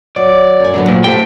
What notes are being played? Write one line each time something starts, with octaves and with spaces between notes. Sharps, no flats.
F#3 D5
F#2 G#5
B2 D3 F#3 B3
A#2 A3 C4
A2 G4 A4 C5 G5